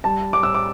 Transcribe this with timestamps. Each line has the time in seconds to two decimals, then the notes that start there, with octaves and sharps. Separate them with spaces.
0.04 G3 A5
0.33 G3 D6
0.43 E6
0.54 D6